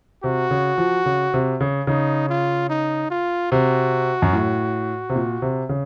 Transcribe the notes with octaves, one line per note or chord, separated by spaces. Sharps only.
C3 F#4
C#3
F3
C#3
C3
C#3
C#3 D#4
F4
D#4
F4
C3 F#4
F#2
A2
C3
A#2
C3
C#3